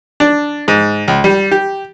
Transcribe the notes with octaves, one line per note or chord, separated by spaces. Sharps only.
D4
G#2
C#2
G3
G4